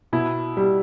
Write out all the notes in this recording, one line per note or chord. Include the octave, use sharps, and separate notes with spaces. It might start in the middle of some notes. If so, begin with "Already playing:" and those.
B2 E4
G3